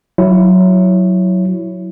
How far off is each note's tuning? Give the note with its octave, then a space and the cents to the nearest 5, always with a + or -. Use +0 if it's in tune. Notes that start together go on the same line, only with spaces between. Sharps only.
F#3 +0 E4 +0 C#5 +0